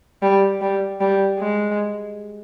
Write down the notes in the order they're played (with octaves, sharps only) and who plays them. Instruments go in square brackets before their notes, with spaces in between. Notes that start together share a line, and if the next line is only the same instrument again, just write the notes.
[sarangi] G3
G3
G3
G#3